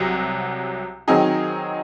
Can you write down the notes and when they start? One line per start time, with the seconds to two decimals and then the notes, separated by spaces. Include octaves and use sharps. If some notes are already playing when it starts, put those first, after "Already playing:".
Already playing: C2 C3 F#3
1.08 D#3 F#3 C4 D#4 G#4